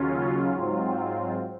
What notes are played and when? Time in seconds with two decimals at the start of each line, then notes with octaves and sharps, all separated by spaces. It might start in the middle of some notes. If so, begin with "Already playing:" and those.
Already playing: D#2 C#3 F#3 C#4 F4
0.54 G#2 F#3 C4 F4